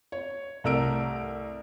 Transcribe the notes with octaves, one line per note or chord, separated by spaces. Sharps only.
C#5
C2 A3 A#4 E6 D7